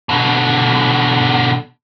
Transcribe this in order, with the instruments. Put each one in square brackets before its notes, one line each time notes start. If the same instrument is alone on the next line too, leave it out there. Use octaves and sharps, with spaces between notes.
[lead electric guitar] B2 D3